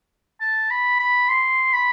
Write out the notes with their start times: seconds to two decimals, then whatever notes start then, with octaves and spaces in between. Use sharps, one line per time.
0.41 A5
0.70 B5
1.00 B5
1.29 C6
1.73 B5